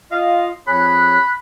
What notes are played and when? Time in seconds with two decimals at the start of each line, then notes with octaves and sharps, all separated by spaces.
0.11 F4 D#5 F5
0.67 F2 G#4 C#5 B5 F#6